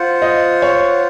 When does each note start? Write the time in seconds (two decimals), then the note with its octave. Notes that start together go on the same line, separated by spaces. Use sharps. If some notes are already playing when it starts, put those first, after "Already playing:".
Already playing: F4 C5 F#5
0.22 D#5
0.62 C#5